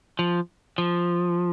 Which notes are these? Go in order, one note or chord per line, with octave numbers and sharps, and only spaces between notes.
F3
F3